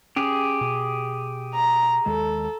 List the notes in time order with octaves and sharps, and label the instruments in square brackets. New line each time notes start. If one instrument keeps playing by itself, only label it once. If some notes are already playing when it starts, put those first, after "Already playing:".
[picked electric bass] C#4 [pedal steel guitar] G4 G#4
[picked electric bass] B2
[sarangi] A#5
[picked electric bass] D#2 D#3 G#3 [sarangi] A4